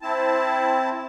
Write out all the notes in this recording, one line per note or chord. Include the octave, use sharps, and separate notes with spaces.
C4 E4 A5